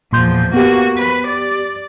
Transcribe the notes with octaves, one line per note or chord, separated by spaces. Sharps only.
E2 A#2 F3 C6 G6
A#3 B3 F#4 G4
B4
D5